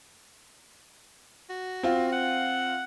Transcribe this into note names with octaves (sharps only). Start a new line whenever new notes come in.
F#4
C4 F4
F#5